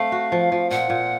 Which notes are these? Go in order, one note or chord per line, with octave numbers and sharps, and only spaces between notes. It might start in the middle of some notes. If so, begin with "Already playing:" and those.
Already playing: A3 C4 F5
F#4
F3
F3
A#2 F#5
A#2